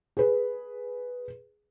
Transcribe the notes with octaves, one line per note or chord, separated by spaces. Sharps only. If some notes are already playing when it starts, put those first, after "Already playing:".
G#4 B4